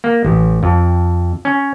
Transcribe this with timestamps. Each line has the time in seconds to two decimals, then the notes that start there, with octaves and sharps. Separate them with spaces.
0.04 A#3
0.25 A1
0.63 F2
1.45 C#4